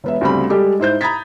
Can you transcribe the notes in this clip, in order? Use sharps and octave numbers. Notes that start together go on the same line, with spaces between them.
E1 B3 E5
D2 C#3 G3 C4 B5
G3 G#3 G4 A4
G#2 E4 C5 G6
A#5 B5 D#6 G#6 A6 B6